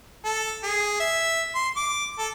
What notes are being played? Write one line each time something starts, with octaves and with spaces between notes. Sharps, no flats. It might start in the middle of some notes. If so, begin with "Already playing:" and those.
A4
G#4
E5
C6
D6
A4